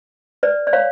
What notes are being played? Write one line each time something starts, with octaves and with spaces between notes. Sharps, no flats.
B4 D5
D5
C#5 F5